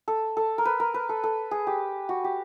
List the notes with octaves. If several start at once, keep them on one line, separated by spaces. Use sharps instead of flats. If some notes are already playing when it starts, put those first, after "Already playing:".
A4
A4
A#4
B4
A#4
B4
A4
A4
G#4
G4
F#4
G4